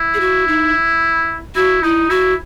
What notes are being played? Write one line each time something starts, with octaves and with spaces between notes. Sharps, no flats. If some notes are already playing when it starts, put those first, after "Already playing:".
Already playing: E4
G#4
F#4
D#4
E4 F#4
D#4 E4
E4 F#4